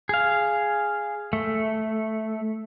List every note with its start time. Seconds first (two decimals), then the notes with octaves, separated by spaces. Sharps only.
0.09 G#4 F5
1.33 A3